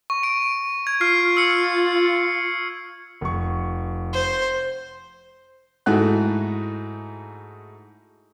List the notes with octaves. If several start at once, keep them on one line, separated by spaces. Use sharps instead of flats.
C#6
D7
G#6
F4 F6 C7
E6 C#7
F1 C#6
C5
G#2 A3 D#4 E4 F#4 F#6